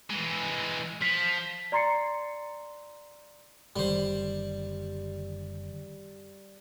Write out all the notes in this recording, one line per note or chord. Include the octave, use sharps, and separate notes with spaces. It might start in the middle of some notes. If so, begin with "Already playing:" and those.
E3 G#3
F3 B6
D5 A#5 C6 A6 C7 C#7
F#1 D3 D#3 G3 C5